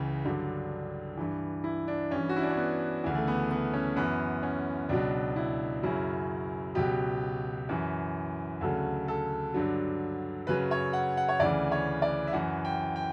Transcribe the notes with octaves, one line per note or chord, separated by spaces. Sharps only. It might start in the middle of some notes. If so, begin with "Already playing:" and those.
Already playing: C#2 C#3 E3
G2 D3 F#3
G2 E3
E4
D4
G2 E3 C#4
F#4
E4
D4
C#4
B3
D2 C#3 E3
A3
B3
B3
C#4
F#2 E3 B3
C#4
C#2 B2 F#3 D4
E4
F#2 C#3 F#3 E4
C#2 B2 F#3 G4
F#2 E3
D2 C#3 F#3 A4
A4
G2 D3 F#3
F#2 C#3 F#3 B4
C#5
F#5
F#5
C#5
D2 C#3 E3 D5
C#5
D5
E5
F#2 E3 F#5
G5
G5